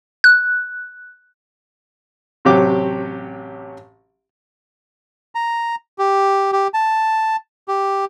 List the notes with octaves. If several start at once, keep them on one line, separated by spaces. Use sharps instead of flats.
F#6
A1 C3 F#3 G4 D6
A#5
G4
G4
A5
G4